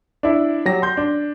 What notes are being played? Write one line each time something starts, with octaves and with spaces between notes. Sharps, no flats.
D4 E4
F#3 G4 A#6
C6 G6
D4